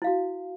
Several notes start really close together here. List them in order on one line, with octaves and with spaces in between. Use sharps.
E4 F5 F#4